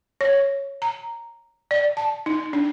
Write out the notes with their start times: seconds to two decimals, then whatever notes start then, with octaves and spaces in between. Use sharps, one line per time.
0.21 C#5
0.82 A#5
1.71 D5
1.97 A5
2.26 D#4
2.53 D4